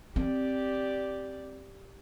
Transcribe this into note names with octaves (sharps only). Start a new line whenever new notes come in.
C4 G4 D5